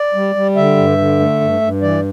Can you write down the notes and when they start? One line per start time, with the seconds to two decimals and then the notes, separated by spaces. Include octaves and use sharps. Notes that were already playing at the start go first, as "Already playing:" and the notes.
Already playing: D5
0.15 G3
0.35 G3
0.56 D3 E5
0.77 G2
0.98 D3
1.20 A3
1.41 G2
1.61 G2
1.82 E3 D5